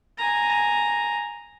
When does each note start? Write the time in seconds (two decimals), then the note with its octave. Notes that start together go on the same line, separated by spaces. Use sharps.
0.18 G#5 A#5